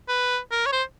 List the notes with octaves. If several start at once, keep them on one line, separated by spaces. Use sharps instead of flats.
B4
A#4
C#5
C5